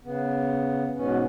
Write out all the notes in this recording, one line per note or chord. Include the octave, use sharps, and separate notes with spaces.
C#3 B3
G#2 B2 B3 C#4